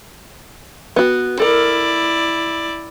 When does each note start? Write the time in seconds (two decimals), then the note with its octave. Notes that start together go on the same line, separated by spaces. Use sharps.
0.96 B3 F#4
1.40 E4 A4 A#4 D5